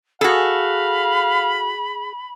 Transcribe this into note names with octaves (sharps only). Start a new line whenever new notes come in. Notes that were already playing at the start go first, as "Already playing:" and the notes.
F#4 G#4 A4 F5 B5